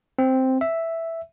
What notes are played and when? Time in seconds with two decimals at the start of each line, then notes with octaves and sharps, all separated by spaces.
0.19 C4
0.61 E5